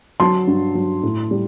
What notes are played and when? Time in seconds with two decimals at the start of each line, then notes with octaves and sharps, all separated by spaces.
0.20 F#3 A5 C6
0.47 G2
0.75 F#3
1.03 A2
1.31 G3